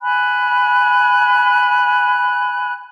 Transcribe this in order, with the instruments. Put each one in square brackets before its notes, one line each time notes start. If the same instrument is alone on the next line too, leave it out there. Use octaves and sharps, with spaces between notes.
[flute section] G#5 B5 F#6